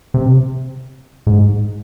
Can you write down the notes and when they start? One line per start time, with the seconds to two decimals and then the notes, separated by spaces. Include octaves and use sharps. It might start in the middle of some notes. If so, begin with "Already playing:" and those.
0.14 C3
1.27 G#2